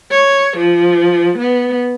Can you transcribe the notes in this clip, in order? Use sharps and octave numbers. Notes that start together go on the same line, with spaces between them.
C#5
F3
B3